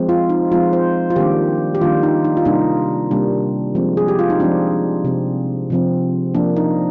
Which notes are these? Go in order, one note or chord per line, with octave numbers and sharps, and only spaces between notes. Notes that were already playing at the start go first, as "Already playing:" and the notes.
Already playing: F3 G#3 C4
F4
D#4
F3 G#3 C4 F4
C5
F4
D#3 G3 A#3 D4 G4
G4
D#3 G3 A#3 D4 F4
D#4
D#4
F4
C3 G3 A#3 D4 D#4
C3 G3 A#3 D4
F3 G#3 C4
G#4
G4
F4
D#4
F3 G#3 C4 D4
C3 F3 C4
C3 F3 C4
F3 A#3 D4
D#4